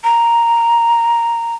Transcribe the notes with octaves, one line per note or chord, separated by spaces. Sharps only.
A#5